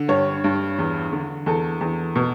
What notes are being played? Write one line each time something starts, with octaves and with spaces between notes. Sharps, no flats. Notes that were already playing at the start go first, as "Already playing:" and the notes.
Already playing: D3
G2 C#5
G2
E2
D3
E2 A4
E2
B2